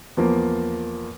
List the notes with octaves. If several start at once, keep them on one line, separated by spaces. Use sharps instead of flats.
E2 F3 A#3